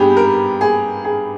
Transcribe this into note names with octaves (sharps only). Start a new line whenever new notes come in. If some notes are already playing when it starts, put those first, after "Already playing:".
Already playing: G2 G3 B3 G4 G#4
A#4
G#4
G#4